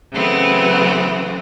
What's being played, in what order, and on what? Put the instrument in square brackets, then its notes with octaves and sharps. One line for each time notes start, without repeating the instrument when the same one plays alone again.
[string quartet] C#3 E3 F#3 A3 B3 C4